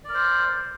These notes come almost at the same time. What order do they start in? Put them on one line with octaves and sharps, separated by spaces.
D5 A#4 C5